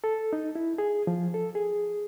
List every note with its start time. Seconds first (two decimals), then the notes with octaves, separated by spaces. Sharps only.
0.04 A4
0.33 D#4
0.55 E4
0.78 G#4
1.07 F3
1.34 A4
1.55 G#4